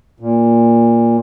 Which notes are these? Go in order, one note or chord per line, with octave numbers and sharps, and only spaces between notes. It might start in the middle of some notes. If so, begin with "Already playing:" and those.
A#2